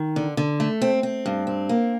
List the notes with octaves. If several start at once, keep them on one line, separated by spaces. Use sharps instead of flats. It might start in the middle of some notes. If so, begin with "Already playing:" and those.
Already playing: D#3
D3
D3
A3
C4
C4
G2
C4
A#3